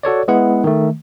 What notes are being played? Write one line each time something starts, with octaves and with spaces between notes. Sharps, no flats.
F#4 A4 C#5 D5
G#3 B3 E4 B4 F#5
D#3 A3